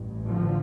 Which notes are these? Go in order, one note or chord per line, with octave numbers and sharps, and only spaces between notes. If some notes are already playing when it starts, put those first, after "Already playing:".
Already playing: A1 G2
D3 F3